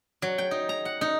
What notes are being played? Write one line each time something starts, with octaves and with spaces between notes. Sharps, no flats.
F#3
G5
D#4
A#5
F#5
D#4